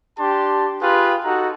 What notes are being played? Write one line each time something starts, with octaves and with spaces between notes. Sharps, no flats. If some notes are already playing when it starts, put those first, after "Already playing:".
D4 G4 A5 C6
F4 G4 G#4 B4
D#4 F#4 A4 A#5